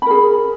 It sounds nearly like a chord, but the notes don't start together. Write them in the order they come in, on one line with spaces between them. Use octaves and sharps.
B5 A#4 G#4